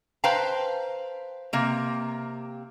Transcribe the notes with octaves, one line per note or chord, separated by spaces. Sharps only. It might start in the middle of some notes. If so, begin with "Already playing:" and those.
B4 C5 F5 G5 A5 A#5
C3 A#3